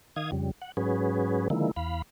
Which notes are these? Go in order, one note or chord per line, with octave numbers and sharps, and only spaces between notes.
D#3 F5 D#6 G#6
F2 C#3 G3
F#5
G#2 F#3 C#4 G#4 B4
D3 D#3 F3 G#3 A#3 E4
E2 F5 B5